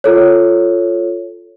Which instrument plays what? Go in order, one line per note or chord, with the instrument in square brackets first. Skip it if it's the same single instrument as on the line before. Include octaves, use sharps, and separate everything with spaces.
[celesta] F4 A4 C#5